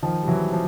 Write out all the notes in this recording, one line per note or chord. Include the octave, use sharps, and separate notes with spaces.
D#3 F3
G3
E3 F#3
F3